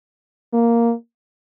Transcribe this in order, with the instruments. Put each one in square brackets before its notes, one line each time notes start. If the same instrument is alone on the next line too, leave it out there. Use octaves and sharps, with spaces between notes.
[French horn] A#3